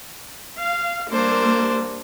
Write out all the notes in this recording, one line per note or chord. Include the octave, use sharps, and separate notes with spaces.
F5
G3 A#3 D4 C5